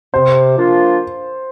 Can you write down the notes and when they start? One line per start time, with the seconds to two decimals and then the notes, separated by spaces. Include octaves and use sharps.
0.14 C3 C5
0.56 F3 A#3 D4 F4